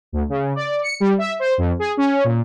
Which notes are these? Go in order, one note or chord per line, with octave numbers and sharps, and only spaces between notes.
D2
C#3
D5
C#7
G3
E5
C5
F2
G#4
C#4
A#2